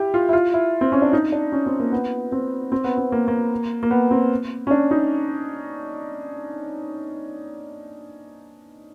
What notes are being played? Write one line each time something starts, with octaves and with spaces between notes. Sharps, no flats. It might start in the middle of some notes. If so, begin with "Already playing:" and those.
Already playing: E4 G4
F4
E4
F4
E4
C4
C#4
D4
D#4
D4
C#4
C4
A#3
B3
C4
C4
B3
C4
A#3
A#3
A#3
B3
C4
C#4
D4
D#4